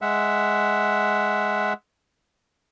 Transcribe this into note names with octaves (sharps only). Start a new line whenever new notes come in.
G#3 E5 F#5